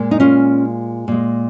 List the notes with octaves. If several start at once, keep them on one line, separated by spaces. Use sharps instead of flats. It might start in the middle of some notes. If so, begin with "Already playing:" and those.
Already playing: A#2 G#3
D#4
C#4 F4
A#2 G#3